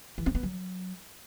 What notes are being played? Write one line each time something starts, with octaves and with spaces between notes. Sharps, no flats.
E3
C4
B3
F#3